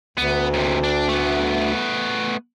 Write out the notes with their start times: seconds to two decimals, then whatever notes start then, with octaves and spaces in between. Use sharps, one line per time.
0.18 D2 B3
0.54 D#2 C3
0.84 D4
1.09 A3 B3